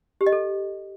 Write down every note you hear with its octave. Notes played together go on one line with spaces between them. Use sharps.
G4
D#5
A4